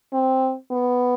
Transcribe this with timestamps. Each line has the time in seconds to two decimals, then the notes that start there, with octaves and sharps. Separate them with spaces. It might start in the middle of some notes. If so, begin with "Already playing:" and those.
0.13 C4
0.71 B3